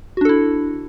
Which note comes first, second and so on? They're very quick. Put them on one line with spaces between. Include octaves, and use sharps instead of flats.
F#4 D4 A4 E4